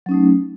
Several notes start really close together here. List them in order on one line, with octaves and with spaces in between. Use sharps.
F#3 C#4 D#4 A3